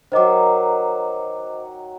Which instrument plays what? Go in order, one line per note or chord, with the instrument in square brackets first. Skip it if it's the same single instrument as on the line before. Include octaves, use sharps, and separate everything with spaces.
[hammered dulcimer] D#3 F#3 [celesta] C5 D#5 D6